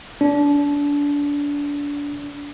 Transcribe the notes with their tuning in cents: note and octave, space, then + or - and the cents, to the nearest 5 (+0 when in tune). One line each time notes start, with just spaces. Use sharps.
D4 -25